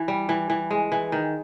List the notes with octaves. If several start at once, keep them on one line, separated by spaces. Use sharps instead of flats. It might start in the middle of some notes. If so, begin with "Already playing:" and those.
Already playing: E3
G3
E3
E3
G#3
E3
D#3